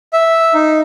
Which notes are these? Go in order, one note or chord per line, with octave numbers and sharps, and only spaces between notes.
E5
D#4